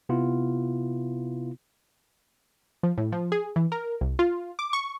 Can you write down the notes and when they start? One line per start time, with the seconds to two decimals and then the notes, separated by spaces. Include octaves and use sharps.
0.09 C3 B3 E4 F4
2.83 F3
2.98 A2
3.12 F3
3.32 G#4
3.56 E3
3.72 A#4
4.01 C2
4.19 F4
4.59 D6
4.73 C#6